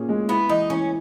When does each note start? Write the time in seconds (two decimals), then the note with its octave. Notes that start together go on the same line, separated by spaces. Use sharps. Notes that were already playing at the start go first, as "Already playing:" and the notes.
Already playing: A#2 C#4 G#4
0.09 G#3
0.28 B3 E4
0.49 E3 D#4
0.70 E3 C#4